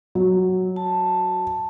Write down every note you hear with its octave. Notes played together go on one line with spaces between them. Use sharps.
F#3
A5